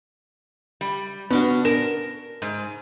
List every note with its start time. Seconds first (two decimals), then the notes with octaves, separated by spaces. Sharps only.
0.81 G3
1.30 B3 C#4 D4 F#4
1.65 A#4 E7
2.42 G#2